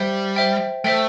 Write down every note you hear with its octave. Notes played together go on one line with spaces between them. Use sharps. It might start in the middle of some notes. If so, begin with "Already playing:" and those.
Already playing: G3 C5 E5 G5
C5 E5 G5
A3 C5 E5 G5